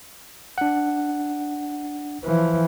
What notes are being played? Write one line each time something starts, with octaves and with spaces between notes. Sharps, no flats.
D4 F#5
E3 F3